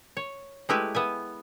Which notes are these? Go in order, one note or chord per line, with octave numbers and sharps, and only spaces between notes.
C#5
G#3 A3 E4 G4 B4 E5
B3 E5 G#5